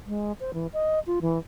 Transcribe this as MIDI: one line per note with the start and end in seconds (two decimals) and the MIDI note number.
0.06 0.32 56
0.40 0.51 72
0.54 0.67 52
0.73 0.99 75
1.07 1.19 65
1.21 1.38 52